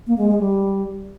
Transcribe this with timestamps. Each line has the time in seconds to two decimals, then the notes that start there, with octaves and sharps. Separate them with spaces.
0.07 A#3
0.18 G#3
0.28 G#3
0.39 G3